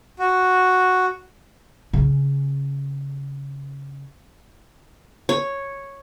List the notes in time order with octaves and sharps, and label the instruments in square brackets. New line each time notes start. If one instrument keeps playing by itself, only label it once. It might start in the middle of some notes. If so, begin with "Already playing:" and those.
[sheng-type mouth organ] F#4
[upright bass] C#3 C#4
[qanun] C#5